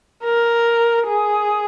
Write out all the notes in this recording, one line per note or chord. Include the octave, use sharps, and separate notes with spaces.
A#4
G#4